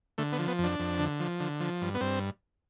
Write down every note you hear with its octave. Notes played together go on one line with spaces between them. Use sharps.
D3 A3
B3
F3
B3
F2 D4
F2
D3
F3
D3
F3
G2
B3
G2 C4